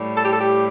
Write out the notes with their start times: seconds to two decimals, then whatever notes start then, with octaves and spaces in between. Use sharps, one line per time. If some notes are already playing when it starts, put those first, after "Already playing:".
Already playing: A2 G3
0.16 A4
0.24 G4
0.31 A4
0.40 G4